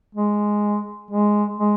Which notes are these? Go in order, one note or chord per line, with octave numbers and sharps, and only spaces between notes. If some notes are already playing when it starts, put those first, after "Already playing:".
G#3
G#3
G#3